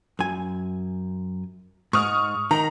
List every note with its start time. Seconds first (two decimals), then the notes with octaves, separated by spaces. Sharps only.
0.19 F#2 G#5
1.93 G#2 C#6 D#6 F6
2.51 D#3 A#5